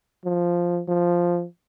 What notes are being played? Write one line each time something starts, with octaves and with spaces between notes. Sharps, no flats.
F3
F3